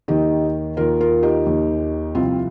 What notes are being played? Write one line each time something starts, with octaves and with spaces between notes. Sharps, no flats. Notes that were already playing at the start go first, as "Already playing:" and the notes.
D#2 D#3 D#4 G4
D#2 D#3 F4 A#4
F4 A#4
D#4 G4
D#2 D#3
C2 C3 F3 C4 F4